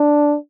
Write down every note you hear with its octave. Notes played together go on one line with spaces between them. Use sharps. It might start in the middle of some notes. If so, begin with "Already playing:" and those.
Already playing: D4